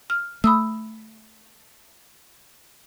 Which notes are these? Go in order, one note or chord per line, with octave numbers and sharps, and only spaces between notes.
F6
A3 B5 D#6 E6